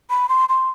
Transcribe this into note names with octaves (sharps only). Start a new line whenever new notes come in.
B5
C6
C6